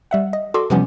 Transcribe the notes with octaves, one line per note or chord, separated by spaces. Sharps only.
G3 E5 F#5
D#5
F#4 A4 D5 C6 D6 D#6
C3 E3 F3 G3 B3 C#4